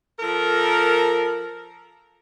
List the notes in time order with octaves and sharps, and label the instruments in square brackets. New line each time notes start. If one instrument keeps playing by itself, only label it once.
[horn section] F3 A4 A#4